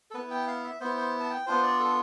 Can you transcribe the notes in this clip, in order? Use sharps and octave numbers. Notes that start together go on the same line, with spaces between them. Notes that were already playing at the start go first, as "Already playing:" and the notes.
A4
B3 E4 B4
G5
F5
E5
B3 E4 C5
C5
A5
G5
B3 D4 F4 C5
D5
A4